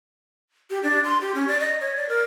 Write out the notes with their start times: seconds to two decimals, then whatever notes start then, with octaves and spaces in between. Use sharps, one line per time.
0.70 G4
0.83 D4
1.05 C6
1.21 G4
1.35 C#4
1.48 D5
1.60 D#5
1.81 C#5
1.97 D5
2.09 A#4